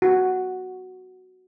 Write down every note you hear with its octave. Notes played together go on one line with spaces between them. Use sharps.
F#4